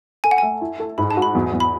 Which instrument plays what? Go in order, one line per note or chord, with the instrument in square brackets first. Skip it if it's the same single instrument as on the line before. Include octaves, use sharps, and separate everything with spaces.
[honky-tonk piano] A4 [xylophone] G#5
[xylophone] F#5
[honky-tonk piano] A3 [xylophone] G#5
[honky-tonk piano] E4
A4
[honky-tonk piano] G#2 [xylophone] B5
[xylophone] A5
[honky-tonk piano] F#4
[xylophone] B5
[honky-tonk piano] E2
E2
[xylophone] B5